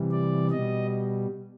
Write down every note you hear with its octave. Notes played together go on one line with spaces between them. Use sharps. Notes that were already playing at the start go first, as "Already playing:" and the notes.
Already playing: C3 E3 G3
D5
B2 G3 D#5